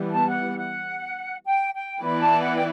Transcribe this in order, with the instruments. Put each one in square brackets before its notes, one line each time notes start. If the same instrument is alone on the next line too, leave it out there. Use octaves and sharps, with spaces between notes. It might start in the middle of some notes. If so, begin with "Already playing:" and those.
Already playing: [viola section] E3 G3 B3
[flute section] A5
F#5
F#5
G5
G5
[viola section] E3 B3 E4 B4 D5 [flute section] B5
[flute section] A5
F#5
G5